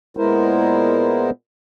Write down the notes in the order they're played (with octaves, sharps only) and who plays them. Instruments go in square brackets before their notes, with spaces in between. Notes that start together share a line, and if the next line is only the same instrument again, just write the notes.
[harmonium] A#2 G#3 B3 E4 A#4 C5